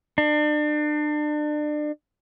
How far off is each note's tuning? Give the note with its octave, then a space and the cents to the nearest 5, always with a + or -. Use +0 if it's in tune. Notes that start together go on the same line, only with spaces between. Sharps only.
D4 +35